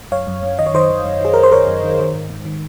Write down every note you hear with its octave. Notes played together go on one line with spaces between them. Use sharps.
F#2 C#5 F5
F#2
F#2
D#3 D#5
C#5
D#3 C5 D#5
D#3
F#2
D#3 G#4
D#3 A#4
C5
D#3 A#4 C#5
F#2
D#3
D#3
G#2
G#2
D#3